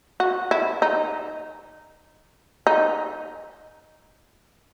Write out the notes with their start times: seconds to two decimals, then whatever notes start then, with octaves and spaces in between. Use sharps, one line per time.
0.20 F#4
0.51 E4
0.82 D#4
2.67 D#4